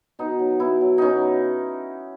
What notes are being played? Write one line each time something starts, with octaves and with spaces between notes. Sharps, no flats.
B2 D#4
F#3
B2 E4
F#3
B2 C#4 D#4